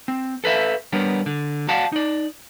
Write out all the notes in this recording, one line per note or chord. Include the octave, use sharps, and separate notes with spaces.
C4
A4 B4 C#5 E5 F5
G3 B3 D4 A#4 C#5
D3
F#4 D5 F5 F#5 A5
D#4 D5